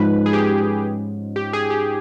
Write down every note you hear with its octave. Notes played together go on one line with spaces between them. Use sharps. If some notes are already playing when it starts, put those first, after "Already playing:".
Already playing: G#2 F3 G#3 C#4 B4
G#4
G4
G4
G#4
G4